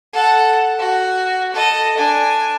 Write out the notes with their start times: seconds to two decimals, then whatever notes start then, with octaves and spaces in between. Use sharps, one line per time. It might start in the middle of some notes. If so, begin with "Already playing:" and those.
0.13 A4 F#5
0.79 F#4
1.54 A4 D#5
1.97 D4 G#5